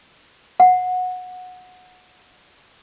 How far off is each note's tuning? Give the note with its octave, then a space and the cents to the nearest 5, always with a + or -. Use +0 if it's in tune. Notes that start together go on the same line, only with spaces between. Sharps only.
F#5 -15